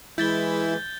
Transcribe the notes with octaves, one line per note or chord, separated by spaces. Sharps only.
E3 G#3 E4 G6 A6 G7